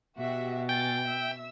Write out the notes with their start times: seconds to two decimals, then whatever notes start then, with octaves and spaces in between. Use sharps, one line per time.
0.18 B2 F#4 G4 E5
0.69 G5 G#5 A6
1.05 E5 E6